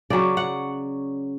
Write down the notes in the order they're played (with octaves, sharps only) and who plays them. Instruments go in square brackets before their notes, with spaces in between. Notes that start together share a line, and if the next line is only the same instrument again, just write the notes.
[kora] C#3 F#3 C#4 D5
F#5